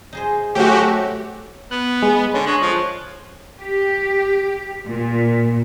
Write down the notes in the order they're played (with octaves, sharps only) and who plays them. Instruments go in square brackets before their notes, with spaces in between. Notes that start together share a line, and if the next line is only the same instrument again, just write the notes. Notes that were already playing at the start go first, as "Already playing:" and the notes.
[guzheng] D#4 G#4 C5
[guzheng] F#3 C#4 C5 [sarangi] A3 [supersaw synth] F#4 G4
[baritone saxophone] B3 [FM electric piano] F#6
[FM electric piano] G#3
[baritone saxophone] D3 [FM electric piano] C#4
[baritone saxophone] G#3 [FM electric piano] C#5 F#6
[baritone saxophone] F3
[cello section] G4
A#2